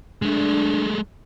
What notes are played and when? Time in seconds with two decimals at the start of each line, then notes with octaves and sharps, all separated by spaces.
0.22 G#3 A3 D4